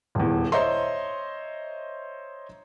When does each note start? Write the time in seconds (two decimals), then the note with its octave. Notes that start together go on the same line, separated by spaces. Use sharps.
0.15 D#1 E2
0.52 C5 C#5 D#5 E5 A#5 C6